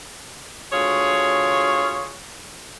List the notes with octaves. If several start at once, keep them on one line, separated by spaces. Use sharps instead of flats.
D2 F4 G#4 C#5